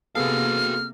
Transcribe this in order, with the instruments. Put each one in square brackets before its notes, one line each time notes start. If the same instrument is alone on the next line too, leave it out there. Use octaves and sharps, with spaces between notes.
[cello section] C3 A#3 [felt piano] B3 G#4 A4 [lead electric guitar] F#4 F5 [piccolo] F6